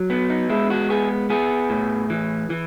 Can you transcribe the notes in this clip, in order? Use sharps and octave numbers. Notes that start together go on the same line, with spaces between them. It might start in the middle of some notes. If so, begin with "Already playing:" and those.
Already playing: F#3
B3
D#4
G#3 E4
F#4
B3 G#4
B3 G#4
A2
E3
E3